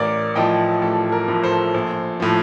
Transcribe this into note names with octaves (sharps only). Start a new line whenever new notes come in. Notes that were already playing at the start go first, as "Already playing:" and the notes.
Already playing: A1 A#4 D5
A2 F3 D#5 G5
A1 A4
A#4
A2 F3
A4 C5
A#1
A2 F3